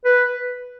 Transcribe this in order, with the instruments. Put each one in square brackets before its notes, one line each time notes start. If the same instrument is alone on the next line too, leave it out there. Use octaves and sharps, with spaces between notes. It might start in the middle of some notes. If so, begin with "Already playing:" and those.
[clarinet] B4